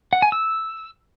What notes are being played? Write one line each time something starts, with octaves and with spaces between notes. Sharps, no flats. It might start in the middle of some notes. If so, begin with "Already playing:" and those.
F#5
G#5
E6